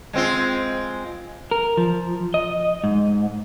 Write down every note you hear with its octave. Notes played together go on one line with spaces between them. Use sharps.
G#3 C4 F4
A#4
F3
D#5
G#2